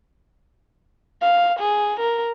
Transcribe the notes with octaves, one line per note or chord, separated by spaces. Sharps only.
F5
G#4
A#4